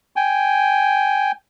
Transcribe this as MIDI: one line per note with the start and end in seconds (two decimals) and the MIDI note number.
0.16 1.32 79
0.16 1.32 80